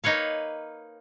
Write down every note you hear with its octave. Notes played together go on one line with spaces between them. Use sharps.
A#3 D#4 B4 C#5 F5